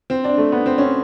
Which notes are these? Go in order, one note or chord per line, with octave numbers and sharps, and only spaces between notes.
C4
D4
A3
B3
C4
C#4